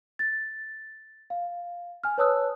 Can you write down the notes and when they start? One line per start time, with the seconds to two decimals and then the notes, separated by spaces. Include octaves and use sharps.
0.19 A6
1.30 F5
2.04 G#5 F6
2.18 B4 C#5 A5 D#6 E6 F#6